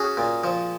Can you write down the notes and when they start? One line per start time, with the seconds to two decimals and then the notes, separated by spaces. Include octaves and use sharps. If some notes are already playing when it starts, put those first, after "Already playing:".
Already playing: C#4 F#4 G#4
0.17 A#2
0.44 F3